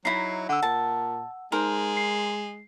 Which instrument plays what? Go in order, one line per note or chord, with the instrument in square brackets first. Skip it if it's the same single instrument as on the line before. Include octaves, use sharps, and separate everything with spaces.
[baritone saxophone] F#3 [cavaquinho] D#4 E4 [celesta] C7
[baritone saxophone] D3 [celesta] F#5 E6
[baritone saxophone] A#2 [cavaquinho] A5
[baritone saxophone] G#3 [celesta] D#4 [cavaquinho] A#4 C5
[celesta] C7